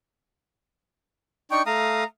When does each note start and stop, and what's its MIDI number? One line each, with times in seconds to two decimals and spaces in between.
1.51 1.62 62
1.51 1.62 63
1.51 1.62 79
1.51 1.63 85
1.66 2.04 57
1.66 2.04 77
1.66 2.05 82
1.66 2.04 87